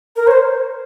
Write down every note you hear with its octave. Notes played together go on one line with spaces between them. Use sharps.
A#4
C#5
C5